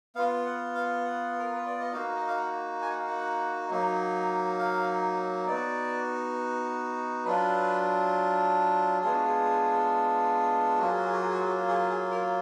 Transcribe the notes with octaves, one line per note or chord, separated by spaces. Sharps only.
B3 F4 F5
F#5
F5
F#5
A#4
B4
D5
D#5
A#3 D#4 F#4 F5
D#5
F5
F#5
G#5
F#5
F5
F#5
F#3 A#3 D#4
F5
B3 D#4 F#4 D5
F#3 D4 F4 B4
G#3 B3 D4 F4 G#4
F#4
G#4
F#3 A#3 F4 F#4
G#4
F#4
G#4
F#4
G#4
F#4
G#4
F#4
G#4
G#4
A#4